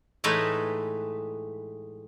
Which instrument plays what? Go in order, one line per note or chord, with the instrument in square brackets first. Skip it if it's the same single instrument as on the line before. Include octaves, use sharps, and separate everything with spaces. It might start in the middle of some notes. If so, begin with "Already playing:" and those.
[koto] A2 E3 G#3 A3 D#4 B4